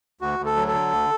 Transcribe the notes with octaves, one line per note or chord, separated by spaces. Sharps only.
D2 F#4
D2
A4
F#3
A4
D3
D2